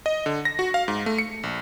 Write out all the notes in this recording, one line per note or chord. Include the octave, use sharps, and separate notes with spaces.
D#5
D3
A#6
F#4
F5
G#2
A3
C#7
A#1